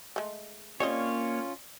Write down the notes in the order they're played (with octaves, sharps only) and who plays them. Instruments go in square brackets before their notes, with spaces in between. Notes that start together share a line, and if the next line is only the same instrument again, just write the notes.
[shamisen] G#3 A3
[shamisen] G3 C4 D#5 [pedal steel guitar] A#3 C#5 [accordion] C#4 F4